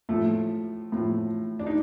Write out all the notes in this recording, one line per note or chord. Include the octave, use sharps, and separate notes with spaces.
A2 F3 A3
A2 F3
D4
D#4